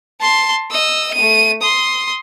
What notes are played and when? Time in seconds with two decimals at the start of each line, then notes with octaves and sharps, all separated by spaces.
0.21 A5 C6
0.71 D#5 E6
1.14 A3 D#7
1.62 C6 D#6